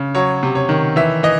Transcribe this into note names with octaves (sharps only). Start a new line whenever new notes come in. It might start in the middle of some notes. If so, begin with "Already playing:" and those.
Already playing: C#3
F#3 C#5
C3
C#5
D#3
E3 E5
E3 D#5